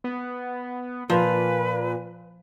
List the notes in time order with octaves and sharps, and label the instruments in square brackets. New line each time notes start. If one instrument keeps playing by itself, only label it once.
[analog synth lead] B3
[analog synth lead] A#2 [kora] F3 [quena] B4